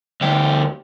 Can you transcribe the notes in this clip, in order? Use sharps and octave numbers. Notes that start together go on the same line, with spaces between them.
D2 G4